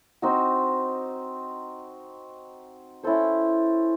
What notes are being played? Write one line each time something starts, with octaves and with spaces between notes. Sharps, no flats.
C4 D#4 F#4
C#4 E4 A4 C5